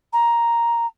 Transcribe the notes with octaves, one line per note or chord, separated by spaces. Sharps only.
A#5